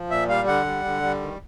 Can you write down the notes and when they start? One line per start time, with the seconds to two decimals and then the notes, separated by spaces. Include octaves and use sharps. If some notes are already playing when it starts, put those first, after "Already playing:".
Already playing: F3
0.10 A#2 E5
0.28 G3 F5
0.47 D3 F#5
0.66 G3
0.85 D3
1.02 G3
1.21 D#3